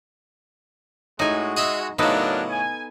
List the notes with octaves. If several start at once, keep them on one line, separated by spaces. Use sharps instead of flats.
A2 G#3 D#4 F#4 G#5
G#4 D#5 E5
A2 C#3 F#3 B3 D4 D#4 A4 A#4
G#5